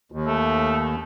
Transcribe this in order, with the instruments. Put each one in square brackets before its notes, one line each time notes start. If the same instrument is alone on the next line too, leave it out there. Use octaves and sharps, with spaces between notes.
[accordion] D#2
[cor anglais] A3